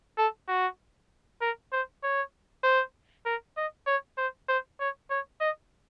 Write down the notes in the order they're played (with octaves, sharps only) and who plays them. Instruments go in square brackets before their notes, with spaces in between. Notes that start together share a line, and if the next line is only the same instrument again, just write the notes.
[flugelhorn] A4
F#4
A#4
C5
C#5
C5
A#4
D#5
C#5
C5
C5
C#5
C#5
D#5